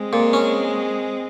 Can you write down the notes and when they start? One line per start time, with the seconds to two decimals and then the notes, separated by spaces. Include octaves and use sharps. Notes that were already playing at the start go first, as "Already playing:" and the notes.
Already playing: G#3 C4
0.13 A#2
0.33 C#4